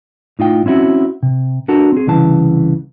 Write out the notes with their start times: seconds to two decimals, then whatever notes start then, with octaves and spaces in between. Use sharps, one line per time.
0.39 A2 D#4 F4 G5
0.66 C4 C#4 E4 F#4
1.23 C3
1.68 D4 F#4 A4 A#4
1.92 C4 G#4
2.07 C2 C#3 E3 A5